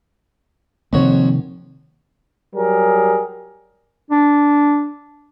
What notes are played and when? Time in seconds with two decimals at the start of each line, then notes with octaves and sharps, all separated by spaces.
0.93 F2 C3 D#3 A#3 F#4 C#5
2.55 F#3 G3 G#4 A#4
4.10 D4